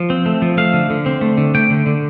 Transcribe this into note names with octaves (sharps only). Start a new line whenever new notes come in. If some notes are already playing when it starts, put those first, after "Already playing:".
Already playing: F3
C4
A3
F3
A3 F5
D3
D3
C4
A3
D3
A3 G5
D3
D3